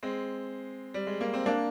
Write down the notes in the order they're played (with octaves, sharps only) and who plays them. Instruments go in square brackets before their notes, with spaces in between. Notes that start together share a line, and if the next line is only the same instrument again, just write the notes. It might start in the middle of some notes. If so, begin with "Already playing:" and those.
[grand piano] G#3 C4
G3
G#3
A#3
C4
A#3 D4